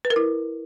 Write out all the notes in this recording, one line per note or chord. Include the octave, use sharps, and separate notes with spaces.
B4
A#4
E4